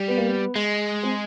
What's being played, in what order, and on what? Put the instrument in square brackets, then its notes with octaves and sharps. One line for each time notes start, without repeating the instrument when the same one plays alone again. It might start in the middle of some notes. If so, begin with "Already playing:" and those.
Already playing: [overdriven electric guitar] G3
[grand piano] B3
A#3
B3
[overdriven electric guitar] G#3
[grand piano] C4